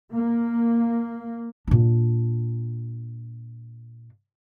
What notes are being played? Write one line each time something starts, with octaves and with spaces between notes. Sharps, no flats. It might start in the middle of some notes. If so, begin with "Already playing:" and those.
A#3
A#2 D4